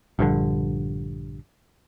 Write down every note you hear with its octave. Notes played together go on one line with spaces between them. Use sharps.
A#1 G2 D3